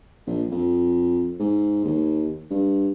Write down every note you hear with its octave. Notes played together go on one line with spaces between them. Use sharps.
A#1
F2
G#2
D#2
G2